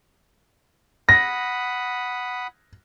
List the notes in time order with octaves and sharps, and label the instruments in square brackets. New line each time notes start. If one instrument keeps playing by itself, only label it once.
[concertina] F#5 B5 D#6 [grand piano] A#6